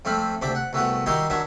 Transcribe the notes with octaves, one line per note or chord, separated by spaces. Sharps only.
F2 A3 C4 F5 B5
D2 C3 D4 B5 D6
F#5
C2 A3 B3 F#4
D#3 G3 D#4 E4 F#4 C6
D#3 F#3 D4 E5